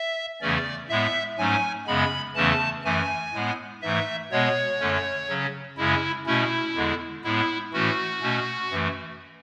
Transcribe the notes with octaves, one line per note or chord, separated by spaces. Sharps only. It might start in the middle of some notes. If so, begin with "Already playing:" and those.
Already playing: E5
E2 C#3 E3 A3 C#4 D5
A2 G#3 B3 E5
G#2 F#3 A3 C#4 G#5
F#2 C#3 G#3 B3 B5
E2 C#3 E3 A3 C#4 A5
F#2 E3 A3 G#5
A2 G#3 B3
G#2 E3 A3 E5
B2 G#3 B3 C#5
F#2 D3 A3 C#4
C#3 F#3 C#4
F#2 C#3 G#3 C#4 E4
B2 A3 C#4 E4
E2 D3 G#3
A2 G#3 B3 E4
A2 E3 A3 C#4 F#4
B2 A3 C#4
F#2 E3 A3